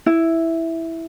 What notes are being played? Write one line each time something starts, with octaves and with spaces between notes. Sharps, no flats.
E4